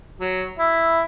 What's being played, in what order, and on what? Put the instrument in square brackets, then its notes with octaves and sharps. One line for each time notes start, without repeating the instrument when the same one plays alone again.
[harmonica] F#3
E4